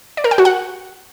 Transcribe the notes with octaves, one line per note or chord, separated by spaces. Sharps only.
D5
A#4
G5
F#4
F#5